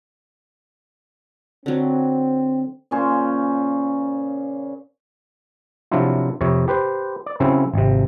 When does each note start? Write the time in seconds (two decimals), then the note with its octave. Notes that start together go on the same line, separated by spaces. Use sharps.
1.66 D3 F#3 C4
2.91 A#2 C#3 C#4 C5
5.91 C3 F3 F#3 D4 E4 F4
6.41 F2 C3 C#5
6.68 G4 B4 C5
7.26 D5
7.40 C#3 F#3 C4 C#4 E4
7.74 G#1 C3